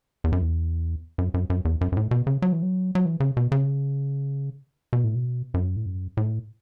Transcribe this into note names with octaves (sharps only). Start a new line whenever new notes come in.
E2
F#2
E2
F#2
F#2
F#2
E2
F#2
F#2
A2
B2
C#3
F#3
E3
F#3
F#3
E3
C#3
B2
C#3
B2
A2
B2
F#2
A2
F#2
A2